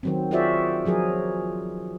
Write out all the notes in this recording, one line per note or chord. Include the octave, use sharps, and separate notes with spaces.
D#3 F#3 C4
F4 F#4 G#4 C5 D5 E5
F3 F#3 G#4 A#4